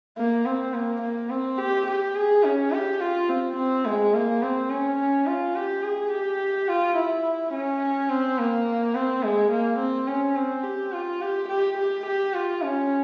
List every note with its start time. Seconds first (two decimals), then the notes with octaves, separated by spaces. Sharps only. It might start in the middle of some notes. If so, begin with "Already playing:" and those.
0.18 A#3
0.45 C4
0.74 A#3
1.02 A#3
1.30 C4
1.58 G4
1.87 G4
2.15 G#4
2.44 C#4
2.73 G4
3.00 F4
3.29 C4
3.57 C4
3.86 G#3
4.14 A#3
4.43 C4
4.70 C#4
4.99 C#4
5.27 F4
5.56 G4
5.83 G#4
6.12 G4
6.69 F4
6.97 E4
7.53 C#4
8.10 C4
8.38 A#3
8.95 C4
9.23 G#3
9.51 A#3
9.79 C4
10.08 C#4
10.36 C4
10.64 G4
10.93 F4
11.22 G4
11.49 G4
11.78 G4
12.06 G4
12.34 F4
12.62 C#4